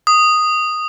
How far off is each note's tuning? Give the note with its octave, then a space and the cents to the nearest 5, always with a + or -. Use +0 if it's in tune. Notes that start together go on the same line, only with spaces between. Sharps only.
D#6 -5